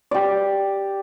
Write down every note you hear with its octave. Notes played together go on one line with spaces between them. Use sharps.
G4 D5